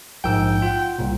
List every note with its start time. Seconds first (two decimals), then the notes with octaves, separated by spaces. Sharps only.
0.24 A#1 G#2 G5 E6
0.62 F4 F#5
0.99 C2 A#2